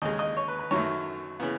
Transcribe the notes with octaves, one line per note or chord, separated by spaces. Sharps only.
D#2 C#3 G#3 D#5
D#5
C#5
B4
B4
F#2 D#3 F#3 A3 C#5
C#3 E3 B3